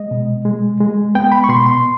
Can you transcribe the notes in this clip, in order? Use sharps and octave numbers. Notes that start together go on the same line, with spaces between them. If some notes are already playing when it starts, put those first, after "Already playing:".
Already playing: G#3 D#5
B2
G#3
G#3
B3 G5
B5
C#6
B2 C6
C6